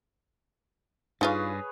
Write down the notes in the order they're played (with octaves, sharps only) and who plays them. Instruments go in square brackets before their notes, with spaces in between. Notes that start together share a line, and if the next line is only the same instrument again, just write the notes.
[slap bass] G2 [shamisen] D#4 F4 F5 [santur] G#4 B4 C#5